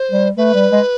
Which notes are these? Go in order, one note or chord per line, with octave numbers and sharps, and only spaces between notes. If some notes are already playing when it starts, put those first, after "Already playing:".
Already playing: C5
G3
A3 B4
G3
G#3